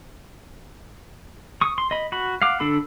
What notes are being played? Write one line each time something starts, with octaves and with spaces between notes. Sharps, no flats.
C#6 D#6
C6
D#5 B5
F#4 B5
F5 F#5 D6
D3 D4 A4 B5